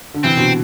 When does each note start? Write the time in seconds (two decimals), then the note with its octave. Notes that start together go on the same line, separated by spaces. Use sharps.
0.14 D3
0.24 C3 E3 C4
0.37 B2 D3